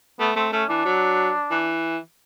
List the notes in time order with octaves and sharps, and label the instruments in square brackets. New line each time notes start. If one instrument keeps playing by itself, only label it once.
[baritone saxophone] A3 [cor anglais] B3
[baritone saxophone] A3 [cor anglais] C4
[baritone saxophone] A3 [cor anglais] C#4
[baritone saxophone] E3 [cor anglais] D4
[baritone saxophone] F#3
E3